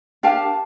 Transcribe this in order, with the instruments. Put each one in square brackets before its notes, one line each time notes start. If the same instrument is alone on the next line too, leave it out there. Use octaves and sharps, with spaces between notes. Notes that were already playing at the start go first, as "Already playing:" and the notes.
[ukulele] D4 G4 A#4 F5 A5